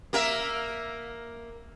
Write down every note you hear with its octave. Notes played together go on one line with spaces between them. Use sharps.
A#3 A#4 E5